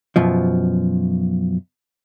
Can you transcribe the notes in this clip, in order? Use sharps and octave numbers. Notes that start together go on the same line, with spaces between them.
F#2 B2 F3